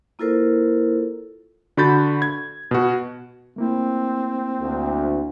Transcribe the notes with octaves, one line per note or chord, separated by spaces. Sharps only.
A#3 E4 F4 A4 A#4 C5
D3 F#4 B5 G6 A6
G#6
B2 F#4
A3 A#3 C4 E4
D2